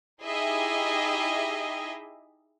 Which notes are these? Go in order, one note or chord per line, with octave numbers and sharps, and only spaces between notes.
D#4 E4 G4 G#4 D#5 E5